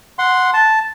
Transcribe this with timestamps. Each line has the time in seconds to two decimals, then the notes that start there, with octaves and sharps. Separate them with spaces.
0.19 F#5 C6
0.54 A5